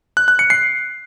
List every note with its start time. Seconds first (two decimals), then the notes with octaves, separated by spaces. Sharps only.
0.17 F#6
0.28 F#6
0.39 C#7
0.50 C7